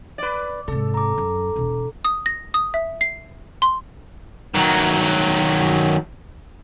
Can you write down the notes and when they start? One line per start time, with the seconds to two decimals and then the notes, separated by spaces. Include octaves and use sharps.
0.18 B4 D5
0.68 G#2 C3 A4
0.94 A#5 D6
1.18 F#2
1.56 E1 B2
2.05 D#6
2.26 A#6
2.54 D#6
2.74 E5
3.01 C7
3.62 C6
4.55 D#3 F#3